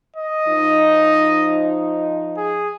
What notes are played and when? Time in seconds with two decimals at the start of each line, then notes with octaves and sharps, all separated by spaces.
0.16 D#5
0.48 F3 D#4
2.37 G#4